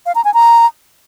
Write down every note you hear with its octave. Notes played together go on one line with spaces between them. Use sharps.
F5
A#5
G#5
A#5